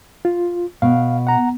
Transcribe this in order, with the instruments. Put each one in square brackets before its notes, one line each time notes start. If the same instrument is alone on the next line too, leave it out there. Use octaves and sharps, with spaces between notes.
[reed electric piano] F4
[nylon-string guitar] B2 [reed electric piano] F5
[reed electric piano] F#5 A#5